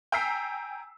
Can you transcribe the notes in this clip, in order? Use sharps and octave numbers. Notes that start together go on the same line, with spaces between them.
G5 G#5 A#5 E6 B6 C7